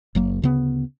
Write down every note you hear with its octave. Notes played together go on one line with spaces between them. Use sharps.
F#1 F#3 A#3
D2 C#3 B3